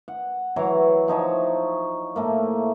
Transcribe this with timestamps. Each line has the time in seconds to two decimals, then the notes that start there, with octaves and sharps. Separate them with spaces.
0.08 F#5
0.56 E3 F#3 C#5 A#5
1.08 F3 D#4 C#5 E5
2.16 A2 A3 A#3